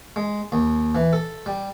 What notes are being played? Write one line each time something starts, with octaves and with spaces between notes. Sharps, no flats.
G#3
D#2
E3
A4
G3